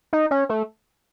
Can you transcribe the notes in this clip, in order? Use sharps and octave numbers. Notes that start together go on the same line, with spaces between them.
D#4
C#4
A3